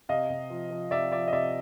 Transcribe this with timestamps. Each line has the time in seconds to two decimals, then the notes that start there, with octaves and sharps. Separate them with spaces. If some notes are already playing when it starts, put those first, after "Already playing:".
0.09 C3 D#5 F5
0.30 C3
0.50 F3
0.71 F3
0.91 C3 D5 E5
1.12 F3 D5 E5
1.28 D#5
1.33 C3 D5 E5